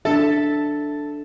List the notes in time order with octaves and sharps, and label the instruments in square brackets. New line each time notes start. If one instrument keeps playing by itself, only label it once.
[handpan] D4 E5 [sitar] A4